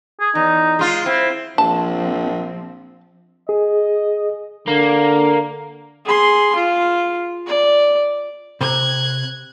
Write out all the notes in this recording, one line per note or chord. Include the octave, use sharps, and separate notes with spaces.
G#4
E2 D#4
G#3 F4
C4 E4
A#1 F3 C4 A5
G#4 D#5
D3 A#3
G#4 C6
F4
D5
C3 A#5 F#6 G#6